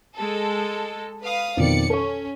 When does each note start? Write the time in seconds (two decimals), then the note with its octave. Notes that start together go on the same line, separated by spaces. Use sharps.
0.16 G#3 A4
1.23 B4 F5 D#6
1.57 F2 B2 D#3 D5 C#7
1.90 C#4 A4 C#6